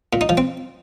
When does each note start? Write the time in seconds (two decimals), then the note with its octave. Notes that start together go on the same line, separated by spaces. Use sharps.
0.13 A#2
0.21 D#4
0.29 F3
0.37 C4